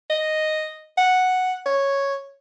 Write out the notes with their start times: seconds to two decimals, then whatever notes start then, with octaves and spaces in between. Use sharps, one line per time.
0.10 D#5
0.98 F#5
1.66 C#5